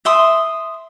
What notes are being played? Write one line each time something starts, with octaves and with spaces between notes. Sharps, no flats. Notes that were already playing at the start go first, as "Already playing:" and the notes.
E5 C6 D#6